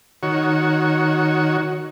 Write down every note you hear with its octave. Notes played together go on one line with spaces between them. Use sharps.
D#3 F#4 C#5